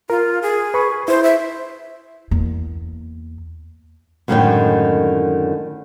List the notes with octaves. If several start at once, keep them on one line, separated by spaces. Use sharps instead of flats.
F4 A#4
G#4
B4 B5 C#6
E4 C5
E5
E2 A#3
F#2 A2 D3 D#3 G#3 G5